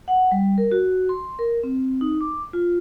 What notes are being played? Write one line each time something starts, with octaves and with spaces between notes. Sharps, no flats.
F#5
G3
A#4
F#4
C6
A#4
C4
D#4
D6
F4